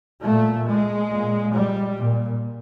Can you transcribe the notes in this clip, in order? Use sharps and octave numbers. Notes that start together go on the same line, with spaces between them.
A#2 A3
G#3
A#2
G3
A#2